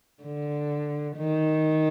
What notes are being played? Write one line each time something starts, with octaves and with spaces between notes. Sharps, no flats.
D3
D#3